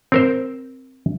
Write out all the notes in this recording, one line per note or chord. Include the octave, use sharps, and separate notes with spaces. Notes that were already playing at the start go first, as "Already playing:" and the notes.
C4 A#4 C5